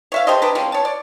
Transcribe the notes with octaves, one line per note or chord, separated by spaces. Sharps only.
C#5 E5 F5
G4 A4 C5 D#5
D4 B4 A#5
F3 G#3 C4 C#4
C#5 A5
D5